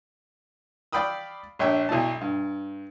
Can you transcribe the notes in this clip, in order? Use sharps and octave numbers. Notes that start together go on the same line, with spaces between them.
D5 F5 G5 B5 D#6 E6
A#1 D4 C#5 E5 G5 E6
B1 B2 E4 D5 A5
G2